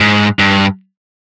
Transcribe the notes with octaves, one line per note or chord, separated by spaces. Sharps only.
G#2
G2